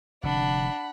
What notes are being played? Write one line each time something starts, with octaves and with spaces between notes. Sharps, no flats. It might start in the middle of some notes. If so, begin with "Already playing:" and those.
F1 D3 D4 F#5 B5